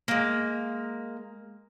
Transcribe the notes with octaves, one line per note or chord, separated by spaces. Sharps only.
G#3 A#3